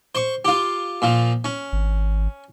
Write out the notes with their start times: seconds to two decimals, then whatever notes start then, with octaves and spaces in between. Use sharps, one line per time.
0.15 C5 C#6
0.45 F4 G4
1.02 A#2 F3
1.45 C#4
1.72 G#1